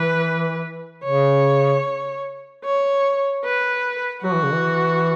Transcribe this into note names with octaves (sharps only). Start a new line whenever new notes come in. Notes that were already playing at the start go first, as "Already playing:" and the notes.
Already playing: E3 B4
C#3 C#5
C#5
B4
F#3 F#4
E3
C#3
E3